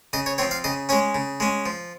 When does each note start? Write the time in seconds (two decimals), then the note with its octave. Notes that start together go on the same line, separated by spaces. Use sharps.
0.13 C#3 D#5
0.26 C#5
0.38 F3 C4 C#5
0.51 F5
0.64 C#3 D#5
0.89 G#3 C#4 C#5
1.15 C#3
1.40 G#3 C#4
1.66 F3